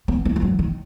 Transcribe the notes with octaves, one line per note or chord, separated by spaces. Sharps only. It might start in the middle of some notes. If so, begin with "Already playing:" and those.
B3
A#3
E3
F#3
D#3